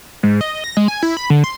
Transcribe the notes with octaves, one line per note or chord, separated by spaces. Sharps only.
G#2
D#5
A#6
G#3
G#5
E4
B5
D3
C6